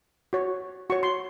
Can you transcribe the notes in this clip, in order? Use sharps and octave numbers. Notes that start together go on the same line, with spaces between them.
F#4 C#5
F#4 C#5 C#6
C6